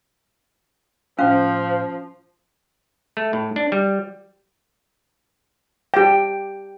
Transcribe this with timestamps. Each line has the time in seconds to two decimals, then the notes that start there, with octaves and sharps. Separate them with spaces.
1.19 A2 F3 C#4 C5 F5 C6 F6
3.17 A3
3.33 A2
3.56 D4
3.72 G3
5.94 G4 G5